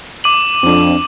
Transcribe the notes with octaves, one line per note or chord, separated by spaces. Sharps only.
D6 D#7 F#7
F2 C4 D4